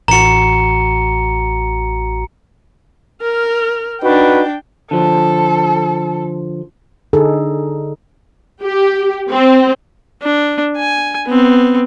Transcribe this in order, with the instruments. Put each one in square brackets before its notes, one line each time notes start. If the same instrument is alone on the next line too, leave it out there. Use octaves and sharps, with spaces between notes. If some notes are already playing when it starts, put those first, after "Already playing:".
[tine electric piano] A1 F#4 [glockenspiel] A#5 C#7
[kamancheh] A#4 F6
[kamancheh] D4 G5 [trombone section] D#4 F#4 B4
[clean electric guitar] D3 F3 [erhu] A4
[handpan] D3 D#4 G#4 A4
[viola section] G4
C4
[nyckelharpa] D4
G#5
B3 C4